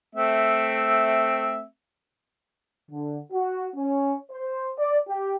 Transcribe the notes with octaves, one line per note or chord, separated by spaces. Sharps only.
A3 C4 E5
D3
F#4
C#4
C5
D5
G4